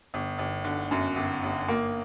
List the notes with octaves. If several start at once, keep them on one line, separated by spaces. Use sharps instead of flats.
G1
G1
D3
F#2
G1
G1
A#3